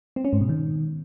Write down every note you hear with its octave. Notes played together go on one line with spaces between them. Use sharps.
C4
C#4
G#2
B2
D#3